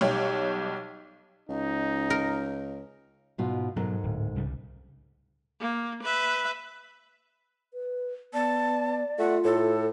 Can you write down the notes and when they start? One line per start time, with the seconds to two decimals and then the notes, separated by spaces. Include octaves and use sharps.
0.01 B1 G3 G4 C#5
1.49 C#2 D#4
2.10 A#4
3.38 G#2 B2 F4
3.76 G#2 B2 F#3 A4 A#4
4.04 D1
4.36 C2 C#3 G3
5.61 A#3
6.03 B4 E5
7.74 B4
8.34 B3 D5 A5
9.19 A3 F4 F#5
9.45 A2 A4